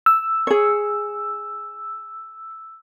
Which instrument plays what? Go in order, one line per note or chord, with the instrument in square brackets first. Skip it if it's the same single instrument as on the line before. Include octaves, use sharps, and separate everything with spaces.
[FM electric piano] E6
[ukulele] G#4 C#5